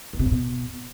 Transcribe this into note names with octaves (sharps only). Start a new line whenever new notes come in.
G2
C3
F#2
B2